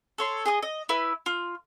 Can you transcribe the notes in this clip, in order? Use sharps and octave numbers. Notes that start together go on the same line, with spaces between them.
A4 C#5 C6
G#4 D#5 D#6
D#5
E4 B4
F4